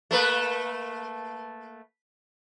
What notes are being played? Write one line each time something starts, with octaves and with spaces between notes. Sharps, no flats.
A3 A#3 B4